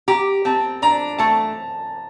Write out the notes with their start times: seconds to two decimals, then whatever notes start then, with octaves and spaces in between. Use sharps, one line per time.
0.08 G4 A#5
0.45 C4 A5
0.82 D4 A#5
1.19 A3 A5